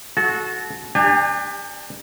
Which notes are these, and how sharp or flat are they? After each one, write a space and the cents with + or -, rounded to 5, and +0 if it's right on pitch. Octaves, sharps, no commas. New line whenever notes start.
F#4 -10 A4 -35
D4 +30 G4 +30 G#5 -35